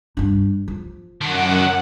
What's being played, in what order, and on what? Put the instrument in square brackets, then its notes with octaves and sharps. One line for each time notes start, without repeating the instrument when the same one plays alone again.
[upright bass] G2 D4
F3
[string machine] F#2 F#5 [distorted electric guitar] D#3 D4